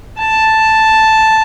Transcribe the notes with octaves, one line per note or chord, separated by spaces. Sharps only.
A5